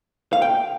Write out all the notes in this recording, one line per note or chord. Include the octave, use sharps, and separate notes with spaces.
F5
G5